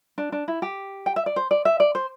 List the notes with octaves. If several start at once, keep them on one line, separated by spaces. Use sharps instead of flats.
D4
D4
E4
G4
G5
E5
D5
C5
D5
E5
D5
C5